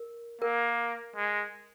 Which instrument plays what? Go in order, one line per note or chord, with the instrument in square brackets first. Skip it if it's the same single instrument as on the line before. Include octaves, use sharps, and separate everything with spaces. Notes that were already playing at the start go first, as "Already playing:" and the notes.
Already playing: [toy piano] A#4
[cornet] A#3 [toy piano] A#4
[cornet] G#3